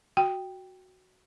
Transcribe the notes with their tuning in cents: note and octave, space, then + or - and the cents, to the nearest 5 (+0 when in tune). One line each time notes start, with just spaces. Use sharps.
F#4 +0 G5 +0